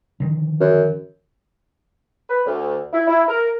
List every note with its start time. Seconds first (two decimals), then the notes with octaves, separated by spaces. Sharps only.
0.20 D3 D#3 F3
0.61 F#2
2.29 B4
2.46 D2
2.93 E4
3.08 E4
3.28 A#4